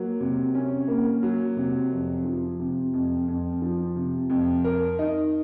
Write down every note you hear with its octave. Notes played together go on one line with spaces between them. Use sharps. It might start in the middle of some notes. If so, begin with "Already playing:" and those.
Already playing: F#3 A#3
C3
C#4
A#3
F#3
C3
F2
F3
C3
F2
F2
F3
C3
F2
A#4
D#4